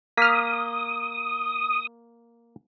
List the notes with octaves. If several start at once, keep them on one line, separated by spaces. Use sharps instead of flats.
A#3 D#6 F6 B6